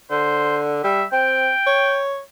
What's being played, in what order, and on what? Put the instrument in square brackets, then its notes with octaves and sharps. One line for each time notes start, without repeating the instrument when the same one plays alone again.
[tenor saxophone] D3 [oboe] C5
[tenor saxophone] G3 [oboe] E5
[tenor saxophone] C4 [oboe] G5
[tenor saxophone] C#5